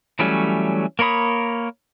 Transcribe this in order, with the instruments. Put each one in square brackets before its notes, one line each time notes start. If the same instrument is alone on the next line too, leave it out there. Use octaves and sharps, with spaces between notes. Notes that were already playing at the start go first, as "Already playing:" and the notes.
[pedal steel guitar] E3 F#3 G3 A3 C#4
A#3 A#4 C#5 B5 D#6